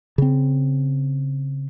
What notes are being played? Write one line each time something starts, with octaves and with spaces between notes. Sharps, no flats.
C#3 C4